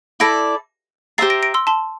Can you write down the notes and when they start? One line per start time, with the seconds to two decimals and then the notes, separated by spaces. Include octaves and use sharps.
0.20 E4 A4 D5 A#6 D7
1.18 G4 C5 E5 A#5 A6 C7
1.30 A#6 D7
1.42 A#6 D7
1.54 C6 E6
1.67 A5 C6